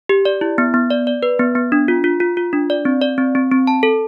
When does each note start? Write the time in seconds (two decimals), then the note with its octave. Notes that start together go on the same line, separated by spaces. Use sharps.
0.09 G4
0.25 D5
0.41 E4
0.58 B3
0.74 B3
0.90 D5
1.07 D5
1.23 B4
1.39 B3
1.55 B3
1.72 D4
1.88 F4
2.04 F4
2.20 F4
2.37 F4
2.53 D4
2.70 D5
2.85 C4
3.02 D5
3.18 C4
3.35 C4
3.52 C4
3.67 A5
3.83 A4